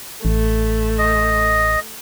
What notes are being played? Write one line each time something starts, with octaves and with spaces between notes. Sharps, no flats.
A1 A3
D#5